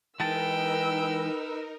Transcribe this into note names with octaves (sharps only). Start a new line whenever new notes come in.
E3 G#3 D#4 A#4 B4 G5 A5 E6